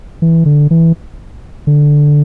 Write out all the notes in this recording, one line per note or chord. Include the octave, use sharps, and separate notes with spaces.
E3
D3
E3
D3